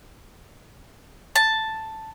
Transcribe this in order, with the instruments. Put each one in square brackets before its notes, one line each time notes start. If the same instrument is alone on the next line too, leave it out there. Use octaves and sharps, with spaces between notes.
[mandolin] A5